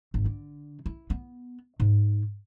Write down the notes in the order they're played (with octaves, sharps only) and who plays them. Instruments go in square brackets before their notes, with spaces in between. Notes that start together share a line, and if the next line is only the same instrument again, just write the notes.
[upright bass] G#1
D3
E4
B3
G#2